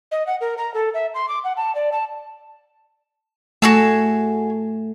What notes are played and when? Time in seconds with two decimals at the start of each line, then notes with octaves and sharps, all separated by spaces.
0.12 D#5
0.27 F#5
0.41 A#4
0.58 A#5
0.74 A4
0.94 E5
1.14 C6
1.28 D6
1.44 F#5
1.57 A5
1.75 D5
1.92 A5
3.62 A3 F#4 G#4 A5